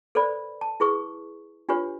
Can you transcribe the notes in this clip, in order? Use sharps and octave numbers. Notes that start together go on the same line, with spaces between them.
A4 B4 C5 D5 B5
A5
E4 G#4 B4 C#6 D#6
D4 F4 G4 B4 C#5